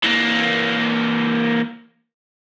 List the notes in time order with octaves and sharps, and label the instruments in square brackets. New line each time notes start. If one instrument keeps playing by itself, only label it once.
[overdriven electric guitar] E3 A#3